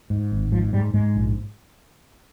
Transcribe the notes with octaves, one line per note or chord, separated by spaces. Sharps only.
G#2
G#1
G#2 F3
G#2 G3
G#2 G#3
A#1